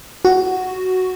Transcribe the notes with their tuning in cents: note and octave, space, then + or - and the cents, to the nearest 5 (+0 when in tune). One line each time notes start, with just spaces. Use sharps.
F#4 +5